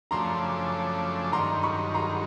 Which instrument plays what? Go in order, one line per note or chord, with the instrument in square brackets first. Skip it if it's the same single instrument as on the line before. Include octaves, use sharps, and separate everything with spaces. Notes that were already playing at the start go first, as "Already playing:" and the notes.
[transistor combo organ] F#2 C#3 F3 A3 D4 [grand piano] A#5 C6
[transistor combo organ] G2 D#3 F#3 [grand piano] A#5 C6
[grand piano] B5 C#6
A#5 C6